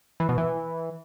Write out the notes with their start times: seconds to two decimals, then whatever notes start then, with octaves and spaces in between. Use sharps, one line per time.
0.20 E3
0.29 B2
0.38 E3